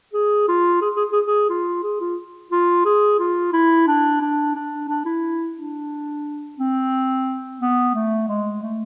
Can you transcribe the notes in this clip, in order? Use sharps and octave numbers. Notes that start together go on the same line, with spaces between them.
G#4
F4
G#4
G#4
G#4
G#4
F4
G#4
F4
F4
G#4
F4
E4
D4
D4
D4
D4
E4
D4
C4
B3
A3
G#3
A3